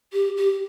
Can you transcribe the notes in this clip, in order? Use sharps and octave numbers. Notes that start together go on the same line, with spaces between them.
G4
G4